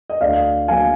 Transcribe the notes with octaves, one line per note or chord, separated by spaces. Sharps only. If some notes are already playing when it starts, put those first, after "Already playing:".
D#5
D2 D5 F5
D3 F#3 A#3 F5 G#5